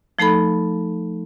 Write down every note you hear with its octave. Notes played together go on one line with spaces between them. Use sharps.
F3 A3 D#4 A4 B5